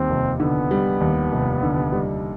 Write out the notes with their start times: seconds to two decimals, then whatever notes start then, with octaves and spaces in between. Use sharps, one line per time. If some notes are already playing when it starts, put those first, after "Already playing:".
Already playing: D#2 G3 C4
0.10 F1
0.40 D3 B3
0.71 G3
1.01 D#2
1.32 F1
1.63 D3
1.92 G3